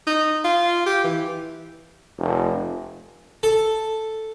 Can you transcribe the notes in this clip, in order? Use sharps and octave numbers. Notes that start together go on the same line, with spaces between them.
D#4
F4
G4
E3
F1
A4